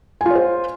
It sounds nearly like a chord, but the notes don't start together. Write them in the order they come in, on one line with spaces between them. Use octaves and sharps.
G#5 F4 C#5 C5